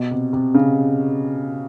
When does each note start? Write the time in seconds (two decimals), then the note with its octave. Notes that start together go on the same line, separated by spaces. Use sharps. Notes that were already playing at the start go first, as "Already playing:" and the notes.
Already playing: B2
0.11 C3
0.33 C3
0.54 C#3